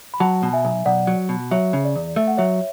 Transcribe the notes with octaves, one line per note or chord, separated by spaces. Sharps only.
B5
F#3 F#5 A5
B2
E5 G#5
B1
B1 D5 F#5
F#3
B2
F#3 C#5 E5
C#3
D5
E2
A3 E5
F#5
F#3 C#5 E5